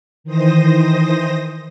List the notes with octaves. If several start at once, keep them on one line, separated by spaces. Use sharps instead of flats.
D#3 E3 C5 D#6 A#6